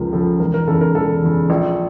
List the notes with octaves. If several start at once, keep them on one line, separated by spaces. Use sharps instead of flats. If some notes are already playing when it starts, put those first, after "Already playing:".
Already playing: C#2 C#3 F3 A#4
C#3 F3 A4
E1 A#4
A#4
E2 C#3 A4
A#4
E1 A4
E2 C#3
A#1